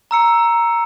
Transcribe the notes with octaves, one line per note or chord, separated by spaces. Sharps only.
A#5 E6 C#7